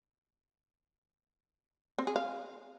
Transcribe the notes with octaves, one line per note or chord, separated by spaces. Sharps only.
C4
G#4
F5